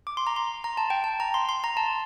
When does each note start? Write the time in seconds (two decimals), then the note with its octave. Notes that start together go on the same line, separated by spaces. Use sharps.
0.07 D6
0.17 C6
0.27 A#5
0.36 C6
0.64 A#5
0.77 A5
0.90 G5
1.04 A5
1.20 A#5
1.34 C6
1.49 C6
1.64 A#5
1.77 A5